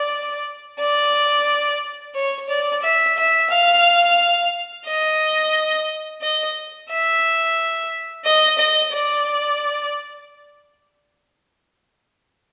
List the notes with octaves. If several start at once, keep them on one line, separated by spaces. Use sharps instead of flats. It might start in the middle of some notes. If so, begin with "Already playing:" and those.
Already playing: D5
D5
C#5
D5
E5
E5
F5
D#5
D#5
E5
D#5
D#5
D5